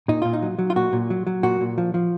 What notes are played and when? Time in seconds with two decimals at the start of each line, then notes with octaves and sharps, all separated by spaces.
0.08 A#2 D#4
0.22 A#2 F4
0.33 D#4
0.42 F#3
0.59 F#3
0.70 F4
0.76 A#2 F#4
0.93 A#2
1.10 F#3
1.27 F#3
1.43 A#2 F#4
1.60 A#2
1.78 F3
1.94 F3